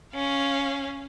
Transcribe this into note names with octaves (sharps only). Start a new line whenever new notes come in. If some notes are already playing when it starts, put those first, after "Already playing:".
C#4 F5